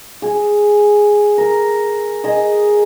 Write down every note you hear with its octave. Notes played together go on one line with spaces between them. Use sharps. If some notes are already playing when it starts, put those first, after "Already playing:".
G#4
A#4
G#4 D#5